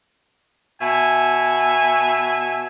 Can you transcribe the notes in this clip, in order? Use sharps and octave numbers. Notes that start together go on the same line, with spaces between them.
B2 E5 G#5